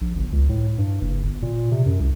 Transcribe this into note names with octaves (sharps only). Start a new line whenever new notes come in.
A#1
G1
C#2
A2
G2
F#1
G1
A#2
C3
F#2
C2